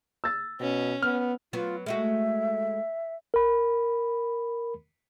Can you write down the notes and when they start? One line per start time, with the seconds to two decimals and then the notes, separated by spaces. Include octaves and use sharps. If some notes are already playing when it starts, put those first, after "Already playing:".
0.24 E6 A6
0.60 B2 C#4
1.03 B3 F6
1.53 F#3 B3 F4
1.86 G#3 A3 F#4 E5
3.34 A#4 B5